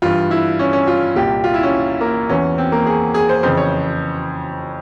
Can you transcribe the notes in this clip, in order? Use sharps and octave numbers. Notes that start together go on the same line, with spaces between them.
G2 E3 F4
E4
C#4
C#4
F4
C2 A#2 G4
F4
E4
C#4
A#3
E2 E3 C#4
C4
A#3
G#4
G#4
C5
F2 C#3 E3 C5
C#5